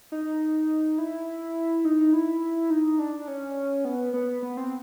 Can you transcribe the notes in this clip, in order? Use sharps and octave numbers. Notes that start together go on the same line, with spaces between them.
D#4
E4
D#4
E4
D#4
D4
C#4
B3
B3
B3
C4